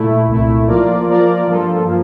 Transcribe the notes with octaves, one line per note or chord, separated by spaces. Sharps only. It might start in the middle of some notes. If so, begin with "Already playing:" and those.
Already playing: A#2 A3 E4
C2 A#2 A3 E4
F3 A#3 F4 A#4 D5
F3 A#3 F4 A#4 D5
G2 F3 A#3 F4 A4
F3 A#3